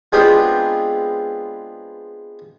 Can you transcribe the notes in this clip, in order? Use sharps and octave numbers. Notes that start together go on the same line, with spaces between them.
G#3 B3 C4 D4 F4 G4